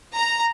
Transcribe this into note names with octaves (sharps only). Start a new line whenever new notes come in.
A#5